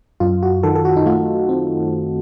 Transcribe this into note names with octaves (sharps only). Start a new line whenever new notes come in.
F#2 F4
F#4
D#3 A4
A4
F#4
D#4
A3 F4
C4